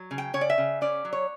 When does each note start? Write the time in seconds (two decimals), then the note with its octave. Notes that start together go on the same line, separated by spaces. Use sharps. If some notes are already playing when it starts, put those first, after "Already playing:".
Already playing: F#3
0.11 C#3
0.18 G5
0.33 C#3 C#5
0.41 D5
0.50 E5
0.58 C#3
0.81 C#4 D5
1.05 F#3
1.13 C#5